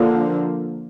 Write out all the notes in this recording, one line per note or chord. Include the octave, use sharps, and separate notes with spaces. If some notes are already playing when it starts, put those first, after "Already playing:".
Already playing: D3 F3 A#3